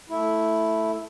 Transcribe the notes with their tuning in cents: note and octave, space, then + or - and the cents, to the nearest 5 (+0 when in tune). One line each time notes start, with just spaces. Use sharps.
A3 +0 E4 +0